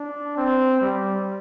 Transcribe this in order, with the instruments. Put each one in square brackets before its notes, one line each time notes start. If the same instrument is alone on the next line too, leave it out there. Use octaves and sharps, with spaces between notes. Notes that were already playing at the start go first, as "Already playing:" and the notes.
Already playing: [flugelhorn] D4
C4
G3